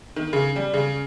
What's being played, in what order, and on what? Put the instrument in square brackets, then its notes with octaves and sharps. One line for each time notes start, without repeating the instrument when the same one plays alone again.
[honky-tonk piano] D#3
C#3
G3
C#3